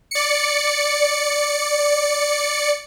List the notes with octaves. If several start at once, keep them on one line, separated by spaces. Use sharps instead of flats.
D5 C#7